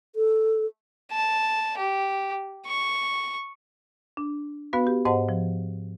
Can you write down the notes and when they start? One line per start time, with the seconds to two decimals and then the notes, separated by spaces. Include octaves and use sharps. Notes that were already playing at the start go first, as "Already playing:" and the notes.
0.15 A4
1.11 A5
1.78 G4
2.66 C#6
4.17 D4
4.73 B3 F#4 B4 F5
4.87 G4
5.05 G#2 C5 D#5 F#5 A5
5.29 F3